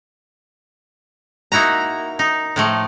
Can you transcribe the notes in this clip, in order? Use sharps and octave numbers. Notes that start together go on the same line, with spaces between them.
A#3 D#4 E4 F#4 A#5
D#4
A2 F3 A3